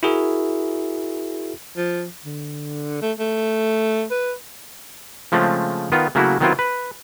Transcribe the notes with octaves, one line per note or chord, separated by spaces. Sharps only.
E4 F#4 G#4 A#4 E5
F3
D3
A3
A3
B4
C#3 F3 G#3 A3 C4
D#3 B3 F4
C#3 F#3 A3 A#3 E4 F#4
D#3 F#3 B3 C4 E4 F4
B4